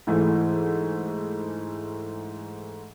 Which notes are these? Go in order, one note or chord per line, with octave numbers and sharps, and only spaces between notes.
G#2 E3 A3